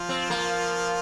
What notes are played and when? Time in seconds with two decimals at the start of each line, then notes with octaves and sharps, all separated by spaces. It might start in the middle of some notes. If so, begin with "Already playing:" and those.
Already playing: F3 F4
0.09 C4
0.30 A#3